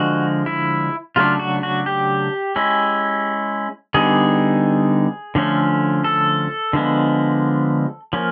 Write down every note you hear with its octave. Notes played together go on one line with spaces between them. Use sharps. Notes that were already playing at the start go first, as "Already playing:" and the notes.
Already playing: D3 F3 G#3 F#4
E4
C#3 F#3 A3 D4 F4
F#4
F#4
G4
G#3 C#4 E4
D3 G3 B3 D#4 G#4
D3 F3 A3 C#4
A4
D3 F3 G#3 B3
F3 A#3 C#4